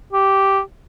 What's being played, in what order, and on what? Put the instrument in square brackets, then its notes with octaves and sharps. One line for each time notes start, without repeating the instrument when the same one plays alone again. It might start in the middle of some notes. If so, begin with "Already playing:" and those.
[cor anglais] G4